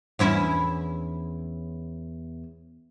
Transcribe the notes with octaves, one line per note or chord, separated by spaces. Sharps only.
E2 C#4 E4